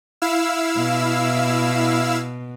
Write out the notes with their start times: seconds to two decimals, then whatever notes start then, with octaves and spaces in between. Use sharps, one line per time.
0.22 E4 F5 E6
0.77 B2